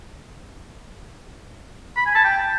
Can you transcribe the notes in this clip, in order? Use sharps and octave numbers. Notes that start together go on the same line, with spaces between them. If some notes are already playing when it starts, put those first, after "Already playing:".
B5
G#5
A5
G5